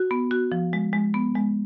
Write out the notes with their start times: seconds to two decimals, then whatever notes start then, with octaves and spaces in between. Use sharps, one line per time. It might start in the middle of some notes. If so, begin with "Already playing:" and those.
Already playing: F#4
0.11 B3
0.31 F#4
0.52 F3
0.73 G#3
0.93 G#3
1.14 B3
1.35 G#3